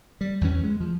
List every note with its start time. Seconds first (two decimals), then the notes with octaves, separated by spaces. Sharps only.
0.21 G3
0.41 E2 E3 C#4
0.64 G#3
0.81 F3